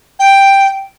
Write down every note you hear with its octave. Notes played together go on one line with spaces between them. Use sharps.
G5